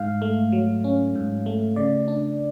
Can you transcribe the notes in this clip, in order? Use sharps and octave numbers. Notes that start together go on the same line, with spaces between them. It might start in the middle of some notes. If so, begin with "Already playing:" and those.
Already playing: G#2 F5
A3
F#3
C#4
G#2
A3
C#3 D5
D4